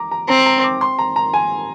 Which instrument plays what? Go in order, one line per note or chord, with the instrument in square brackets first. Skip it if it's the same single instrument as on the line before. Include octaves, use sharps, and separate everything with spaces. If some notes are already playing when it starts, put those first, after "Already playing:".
Already playing: [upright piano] A#5 D6
A#5
[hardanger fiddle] C4 [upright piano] A#5
[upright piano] A#5
D6
C6
A#5
A#5
G#5